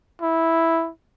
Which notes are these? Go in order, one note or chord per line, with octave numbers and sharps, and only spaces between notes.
E4